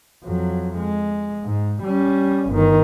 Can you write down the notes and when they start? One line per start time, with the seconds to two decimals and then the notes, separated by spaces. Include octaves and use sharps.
0.24 F2 F#3
0.78 G#3
1.44 G#2
1.83 G3 C#4
2.50 G1 D#3